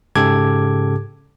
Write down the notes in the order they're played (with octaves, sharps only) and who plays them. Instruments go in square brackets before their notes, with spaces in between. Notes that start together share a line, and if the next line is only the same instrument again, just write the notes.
[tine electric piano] G#2 C#3 G4 A4 D6 G#6